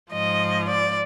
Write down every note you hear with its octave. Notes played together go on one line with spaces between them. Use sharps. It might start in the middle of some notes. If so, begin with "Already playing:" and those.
G#2 F3 D#5
D5